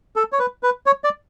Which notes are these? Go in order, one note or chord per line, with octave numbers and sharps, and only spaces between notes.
A4
C#5
B4
B4
C#5
D5